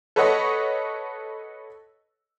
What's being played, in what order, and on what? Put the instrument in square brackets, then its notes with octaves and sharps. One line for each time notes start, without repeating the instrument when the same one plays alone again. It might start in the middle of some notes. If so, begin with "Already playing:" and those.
[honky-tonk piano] A4 B4 C#5 D#5 F#5 C#6